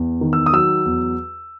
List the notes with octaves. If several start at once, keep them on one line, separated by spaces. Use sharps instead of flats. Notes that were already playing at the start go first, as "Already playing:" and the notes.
Already playing: E2
D#3
E6
D#6
F#3 E6
E2